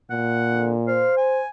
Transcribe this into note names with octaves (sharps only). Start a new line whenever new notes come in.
A#2 F#5
F2 D3
C5 F5
G#5